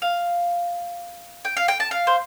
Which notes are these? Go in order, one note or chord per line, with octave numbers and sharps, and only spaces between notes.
F5
G5
F5
G5
A5
F5
C5